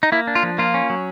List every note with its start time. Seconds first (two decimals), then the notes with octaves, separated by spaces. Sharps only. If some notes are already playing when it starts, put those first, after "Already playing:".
0.03 D#4
0.12 A#3 E4
0.27 D4
0.35 F4
0.43 F3
0.58 A#3 F4
0.74 C#4
0.90 F#3